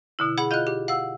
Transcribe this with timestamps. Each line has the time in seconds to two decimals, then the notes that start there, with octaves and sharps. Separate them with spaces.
0.19 B2 D3 E4
0.38 G#4 F#5 B5
0.51 F4 D#5 F5 F#6 G6
0.67 G4
0.88 F5 F#5 E6